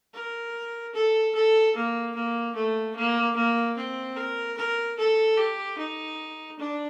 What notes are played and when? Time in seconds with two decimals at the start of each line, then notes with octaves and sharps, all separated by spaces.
0.13 A#4
0.95 A4
1.34 A4
1.75 A#3
2.15 A#3
2.55 A3
2.95 A#3
3.35 A#3
3.77 C4
4.16 A#4
4.57 A#4
4.98 A4
5.37 G4
5.77 D#4
6.59 D4